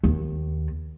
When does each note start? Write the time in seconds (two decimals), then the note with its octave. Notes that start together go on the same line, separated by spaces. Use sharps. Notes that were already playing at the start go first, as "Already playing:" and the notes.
0.04 D#2